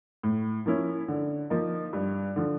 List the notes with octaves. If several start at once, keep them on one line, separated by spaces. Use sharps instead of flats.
A2
F3 A#3 C#4 E4
D3
F3 A#3 D#4
G2
D3 F3